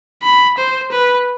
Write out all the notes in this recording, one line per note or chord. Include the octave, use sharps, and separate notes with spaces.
B5
C5
B4